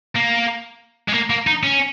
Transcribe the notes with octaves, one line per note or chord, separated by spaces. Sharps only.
A#3
G#3
A#3
A#3
D#4
C#4